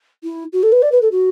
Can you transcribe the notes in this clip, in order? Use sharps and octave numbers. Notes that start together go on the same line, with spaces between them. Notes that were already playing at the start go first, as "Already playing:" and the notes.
E4
F#4
A4
B4
D5
B4
A4
F#4